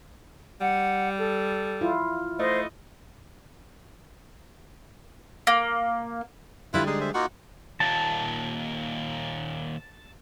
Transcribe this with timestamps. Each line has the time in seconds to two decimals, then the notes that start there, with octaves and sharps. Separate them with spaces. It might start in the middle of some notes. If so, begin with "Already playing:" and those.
0.61 G3 F#5
1.19 A4
1.81 E4 F4
2.39 A3 C5 D#5
5.47 A#3
6.74 D3 G3 E4 F4 B4
6.87 G#3 D#4 G#4
7.01 C5 E5
7.14 A#3 D#4 F4 F#4
7.80 D#2 A#2 A5